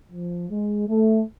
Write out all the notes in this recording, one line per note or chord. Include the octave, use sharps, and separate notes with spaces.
F3
G#3
A3